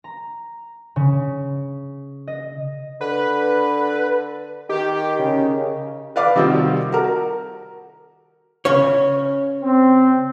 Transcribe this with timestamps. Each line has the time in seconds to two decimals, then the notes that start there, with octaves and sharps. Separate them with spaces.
0.04 A#5
0.96 C#3
2.28 D#5
3.01 D3 B4
4.70 D#3 G4
5.19 C#3
6.16 B4 D5 F5 D6
6.36 C3 D#3 G3 C4 F4 F#4
6.92 F#4 A#4
8.65 C#3 C#4 C#5
9.63 C4